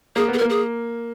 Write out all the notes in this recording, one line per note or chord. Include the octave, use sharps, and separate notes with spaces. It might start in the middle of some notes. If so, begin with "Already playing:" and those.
A#3 G#4
B3
G#4
A#4
A#3
G#4